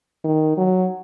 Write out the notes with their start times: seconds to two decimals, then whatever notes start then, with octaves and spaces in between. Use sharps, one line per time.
0.24 D#3
0.57 F#3